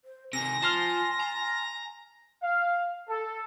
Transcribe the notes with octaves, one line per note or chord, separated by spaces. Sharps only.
C5
C3 D#3 G#5 A#6
F3 A5 C6 F6
A#5
F5
A4